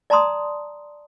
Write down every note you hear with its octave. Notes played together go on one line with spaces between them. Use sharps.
D5 A5 A#5 C6 D#6